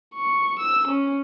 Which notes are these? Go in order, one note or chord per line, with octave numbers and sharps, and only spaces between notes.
C#6
E6
C#4